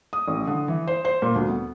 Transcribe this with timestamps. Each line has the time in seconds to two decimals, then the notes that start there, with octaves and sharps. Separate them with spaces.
0.13 D#6
0.28 A1
0.47 D3
0.68 E3
0.87 C5
1.05 C5
1.22 A#2
1.36 D2
1.49 B3